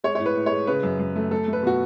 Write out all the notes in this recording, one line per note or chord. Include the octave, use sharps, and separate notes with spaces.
G#3 C#5
A2 C#5
B4
A2
G#3 C#5
C#3 B4
F#2
F#2
A3
A3 A4
A3
B4
B2 F#4